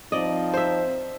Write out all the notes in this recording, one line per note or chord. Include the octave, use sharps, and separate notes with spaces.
F3 C4 D#4 D5 D#5
C5 E5